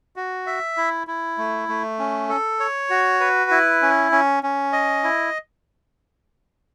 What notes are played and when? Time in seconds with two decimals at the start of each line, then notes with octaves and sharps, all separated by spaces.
0.16 F#4
0.46 E5
0.77 E4
1.07 E4
1.38 A3
1.69 A3
1.99 C#4
2.29 A4
2.60 C#5
2.90 F#4
3.20 B4
3.51 E4
3.82 C#4
4.12 C#4
4.43 C#4
4.73 D#5
5.04 E4